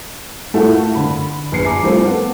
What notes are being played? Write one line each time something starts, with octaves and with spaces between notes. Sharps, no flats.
A2 A3 A#3 F4 F#4 A4
D3 B5
A#1 B4 C7 C#7
G#5 A#5 D6
F3 G3 A3 A#3 C4 F4
B3 A4